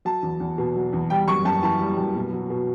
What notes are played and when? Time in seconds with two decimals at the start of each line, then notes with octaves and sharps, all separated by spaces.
0.05 F#3 A5
0.23 E2
0.40 E2
0.58 B2
0.76 F#3
0.93 E2
1.10 G3 G5
1.28 F#2 C#6
1.45 F#2 A5
1.63 E3 A5
1.80 G3
1.97 F#2
2.15 B2
2.33 F#3
2.50 B2